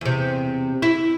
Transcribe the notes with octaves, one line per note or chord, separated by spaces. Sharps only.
E2 C3
E4